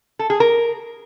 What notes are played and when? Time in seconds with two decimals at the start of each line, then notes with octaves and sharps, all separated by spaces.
0.19 A4
0.30 G#4
0.40 A#4